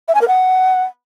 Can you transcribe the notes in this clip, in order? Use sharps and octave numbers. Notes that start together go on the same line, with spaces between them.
E5
G#5
A#4
F#5